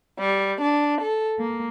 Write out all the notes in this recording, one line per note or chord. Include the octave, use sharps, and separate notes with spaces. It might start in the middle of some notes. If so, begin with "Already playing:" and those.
G3
D4
A4
A#3